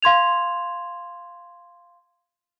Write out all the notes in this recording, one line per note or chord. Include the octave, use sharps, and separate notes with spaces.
F5 C6 G#6 F7